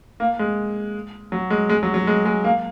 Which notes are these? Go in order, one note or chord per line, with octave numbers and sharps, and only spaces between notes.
A#3
G#3
F#3
G#3
G#3
F#3
F#3
G#3
G#3
A#3